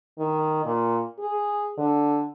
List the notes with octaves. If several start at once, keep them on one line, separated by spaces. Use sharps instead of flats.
D#3
A#2
G#4
D3